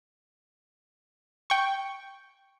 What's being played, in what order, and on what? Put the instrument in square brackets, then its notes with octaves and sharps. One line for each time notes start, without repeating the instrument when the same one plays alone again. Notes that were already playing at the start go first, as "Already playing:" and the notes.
[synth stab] G5 C#6